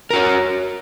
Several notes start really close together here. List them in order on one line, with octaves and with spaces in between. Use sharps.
A#4 F#4 C#5